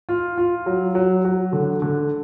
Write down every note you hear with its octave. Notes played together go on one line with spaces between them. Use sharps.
F4
F4
F#3
F#3
F#3
D3
D3